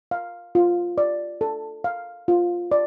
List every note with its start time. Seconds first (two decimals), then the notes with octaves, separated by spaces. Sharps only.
0.11 F5
0.55 F4
0.98 D5
1.41 A4
1.84 F5
2.28 F4
2.72 D5